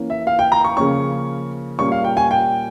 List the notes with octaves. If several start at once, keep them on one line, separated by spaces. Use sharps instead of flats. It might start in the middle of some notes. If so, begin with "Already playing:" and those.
Already playing: E3 A#3 C#4
E5
F5
G5
A#5
C#6
C#3 F3 A#3 C#4 C#6
A#2 G3 A#3 C#4 C#6
F5
G5
G#5
G5